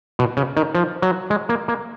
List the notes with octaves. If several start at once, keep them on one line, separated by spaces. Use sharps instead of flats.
B2
C#3
D#3
F3
F#3
G#3
A#3
A#3